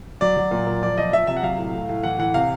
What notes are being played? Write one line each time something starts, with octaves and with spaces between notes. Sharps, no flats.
F#3 D5
F#3
A#2
A#2
F3 D5
F3 D#5
F3 E5
C3 E5
F#5
F#3 F5
A2
A2
A2
E3 F#5
E3 F#5
C3 F5